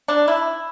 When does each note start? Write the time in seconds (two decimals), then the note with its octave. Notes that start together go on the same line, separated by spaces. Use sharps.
0.08 D4
0.28 E4